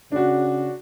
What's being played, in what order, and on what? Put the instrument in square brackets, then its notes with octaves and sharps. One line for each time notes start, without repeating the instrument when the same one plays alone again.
[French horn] C#3 [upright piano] D4 F#4